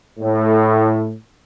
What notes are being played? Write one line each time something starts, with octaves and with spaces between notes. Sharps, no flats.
A2